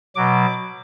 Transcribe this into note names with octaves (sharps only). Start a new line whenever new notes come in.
B2 F#3 D6